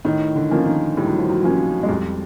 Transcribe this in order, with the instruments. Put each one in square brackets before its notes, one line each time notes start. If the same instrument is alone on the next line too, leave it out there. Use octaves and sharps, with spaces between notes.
[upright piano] A2 [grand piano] D#3
[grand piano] D3
[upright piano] F3 A#3 C#4
[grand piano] D#3
[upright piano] A2 [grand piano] G3
[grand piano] F#3
F3
F#3
[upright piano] F3 A#3 C#4
[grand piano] G#3
[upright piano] F2 [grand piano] G3